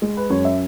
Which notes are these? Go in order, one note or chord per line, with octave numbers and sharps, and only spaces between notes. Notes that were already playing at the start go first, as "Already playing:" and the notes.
G#3
B4
F#2 C#5
E5